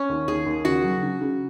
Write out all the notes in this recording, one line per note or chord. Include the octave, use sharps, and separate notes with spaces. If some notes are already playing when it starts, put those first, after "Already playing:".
Already playing: C#4
D#2
D#2 G#4
D#2
C#3 F#4
F#3
C#3
C#3